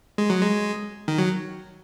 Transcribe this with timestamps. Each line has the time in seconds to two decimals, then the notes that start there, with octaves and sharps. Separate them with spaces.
0.18 G#3
0.30 F#3
0.42 G#3
1.08 D#3
1.18 F#3